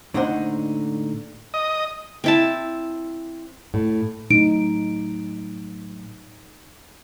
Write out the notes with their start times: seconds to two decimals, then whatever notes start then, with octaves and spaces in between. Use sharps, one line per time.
0.14 A2 D3 A#3 D#4 C5 F#5
1.54 D#5
2.24 C4 E4 A5
3.74 A2
4.31 A2 F#3 D#4 D7